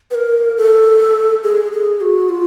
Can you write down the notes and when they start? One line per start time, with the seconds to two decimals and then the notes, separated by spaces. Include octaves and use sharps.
0.11 B4
0.15 A#4
0.57 A4
1.44 G#4
1.72 G#4
2.01 F#4
2.29 F4